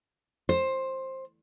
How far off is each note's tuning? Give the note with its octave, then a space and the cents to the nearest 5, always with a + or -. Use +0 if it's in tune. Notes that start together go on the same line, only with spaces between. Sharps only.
C5 +15